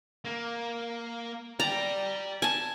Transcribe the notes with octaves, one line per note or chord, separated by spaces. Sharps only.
A#3
D5 G5 A#5
G#5 A5